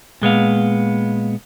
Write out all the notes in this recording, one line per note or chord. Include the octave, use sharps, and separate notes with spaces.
A#2 G#3 B3 F5